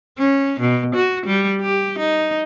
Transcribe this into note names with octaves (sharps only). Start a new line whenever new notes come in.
C#4
B2
F#4
G3
G4
D#4